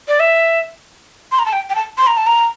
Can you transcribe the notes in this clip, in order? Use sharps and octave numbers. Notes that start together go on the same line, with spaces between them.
D5
E5
C6
A#5
A5
G5
G5
A5
C6
A#5
A5
A#5